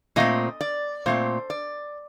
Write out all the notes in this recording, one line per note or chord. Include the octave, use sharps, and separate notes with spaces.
A#2 A3 C4 D#5
D5
A#2 A3 C4 C5
D5